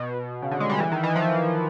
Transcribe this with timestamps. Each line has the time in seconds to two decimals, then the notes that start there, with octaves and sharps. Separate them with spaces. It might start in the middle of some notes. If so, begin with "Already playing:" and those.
Already playing: B2
0.42 C#3
0.51 D3
0.60 G#3
0.69 G3
0.79 E3
0.92 D#3
1.03 E3
1.16 F3